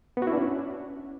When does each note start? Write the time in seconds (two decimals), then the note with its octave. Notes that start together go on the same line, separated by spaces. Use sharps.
0.17 B3
0.22 F#4
0.27 E4
0.32 D4
0.37 C#4